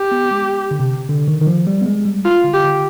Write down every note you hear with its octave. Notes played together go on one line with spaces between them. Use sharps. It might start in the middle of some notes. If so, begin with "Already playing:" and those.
Already playing: G4
B3
G#3
D3
C3
D3
D#3
D#3
F3
G3
B3
G#3
G3
F4
D3
G4
D3